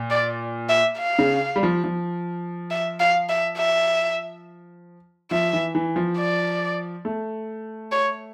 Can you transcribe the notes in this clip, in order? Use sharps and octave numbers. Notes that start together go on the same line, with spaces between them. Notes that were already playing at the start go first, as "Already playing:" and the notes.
Already playing: A#2
D5
E5
F5
C#3
G3
F3
F3
E5
F5
E5
E5
F3 E5
E3
E3
F3
D5
A3
C#5